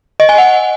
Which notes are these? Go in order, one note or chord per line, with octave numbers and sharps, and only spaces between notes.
D#5
G#5
F#5